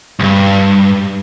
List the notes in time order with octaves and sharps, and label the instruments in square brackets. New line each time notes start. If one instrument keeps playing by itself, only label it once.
[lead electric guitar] C2 G2